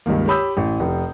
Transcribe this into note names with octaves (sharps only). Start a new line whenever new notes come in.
C#2 G2 D#3 A#3
G4 C#5 B5 D#6 E6 G6
A1
F1